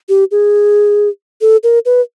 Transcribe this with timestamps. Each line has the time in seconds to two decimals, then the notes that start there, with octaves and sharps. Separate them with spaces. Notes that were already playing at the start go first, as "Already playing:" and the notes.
0.09 G4
0.31 G#4
1.41 A4
1.63 A#4
1.85 B4